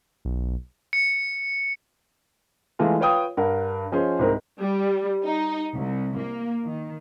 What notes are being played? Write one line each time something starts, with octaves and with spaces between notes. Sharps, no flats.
B1
C#7
E3 G#3 A3 F4
F4 B4 C#5 F5 G5 D#6
G2 A#4 F#5
F3 C#4 G#4 C5 D#5
C2 G#2 C4 A#4
G3
D#4
C2
A#3
D#3